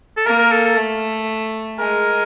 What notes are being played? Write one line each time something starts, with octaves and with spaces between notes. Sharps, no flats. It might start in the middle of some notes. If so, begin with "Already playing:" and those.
A4
A#3 A#4
A#4
A4
A4
A3
G#3 A#4